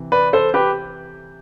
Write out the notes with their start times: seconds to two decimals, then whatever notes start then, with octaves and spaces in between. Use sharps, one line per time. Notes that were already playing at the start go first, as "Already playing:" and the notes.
Already playing: C3 E3
0.12 B4 D5
0.33 A4 C5
0.54 G4 B4